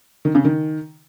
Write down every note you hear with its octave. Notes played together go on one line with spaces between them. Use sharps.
D#3
C#3
D#3